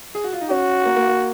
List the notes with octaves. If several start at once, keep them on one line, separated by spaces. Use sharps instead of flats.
G#4
F#4
F4
D#4
C#4 F#4
A#3
A#3
A#3